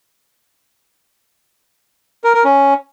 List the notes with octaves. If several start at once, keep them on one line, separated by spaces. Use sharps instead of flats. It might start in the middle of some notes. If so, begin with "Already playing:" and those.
A#4
A#4
C#4